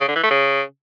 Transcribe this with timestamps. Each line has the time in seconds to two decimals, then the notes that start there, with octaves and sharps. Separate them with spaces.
0.01 C#3
0.08 D3
0.16 E3
0.23 A3
0.31 C#3